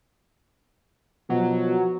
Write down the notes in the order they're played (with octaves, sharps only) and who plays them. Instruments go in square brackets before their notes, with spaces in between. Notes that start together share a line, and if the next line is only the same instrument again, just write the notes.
[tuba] B2 [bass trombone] F3 [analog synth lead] F#3